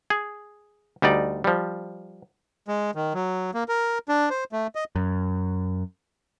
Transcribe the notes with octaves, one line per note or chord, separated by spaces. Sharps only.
G#4
D2 G3 D#4 D5
F3 G3
G#3
D#3
F#3
A#3
A#4
D4
C5
A3
D#5
F#2